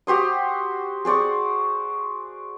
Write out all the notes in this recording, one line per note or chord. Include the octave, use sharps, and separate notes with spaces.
F#4 G4 C5 D#6
G#4 C5 D5 C#6